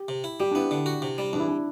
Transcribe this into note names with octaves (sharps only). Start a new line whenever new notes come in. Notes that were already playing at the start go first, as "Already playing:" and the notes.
Already playing: G4
C3
E4
G3 G4
D4
B3 E4
D3
F#4
C3
G3
E2 D4
E4
D4